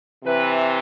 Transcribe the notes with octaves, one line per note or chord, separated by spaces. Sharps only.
C3 E3 B4